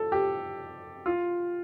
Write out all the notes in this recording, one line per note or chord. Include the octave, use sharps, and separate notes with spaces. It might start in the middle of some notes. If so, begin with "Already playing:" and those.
Already playing: A4
G4
F4